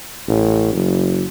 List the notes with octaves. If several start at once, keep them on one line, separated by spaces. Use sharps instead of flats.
A1
F#1